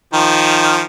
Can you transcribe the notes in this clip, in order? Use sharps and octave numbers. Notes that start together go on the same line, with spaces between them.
D#3 F3